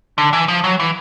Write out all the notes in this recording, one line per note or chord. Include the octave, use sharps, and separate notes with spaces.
D3
E3
F3
F#3
E3